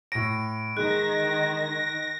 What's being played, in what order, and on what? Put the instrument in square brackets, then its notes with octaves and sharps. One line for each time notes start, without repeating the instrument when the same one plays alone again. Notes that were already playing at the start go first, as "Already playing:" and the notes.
[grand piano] A2 A#6 [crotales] D7
[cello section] D#3 [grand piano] G#3 [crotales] F#6 [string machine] A#6